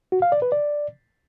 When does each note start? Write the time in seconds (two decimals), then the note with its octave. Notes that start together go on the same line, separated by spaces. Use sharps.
0.12 F#4
0.22 F5
0.32 D5
0.42 B4
0.52 D5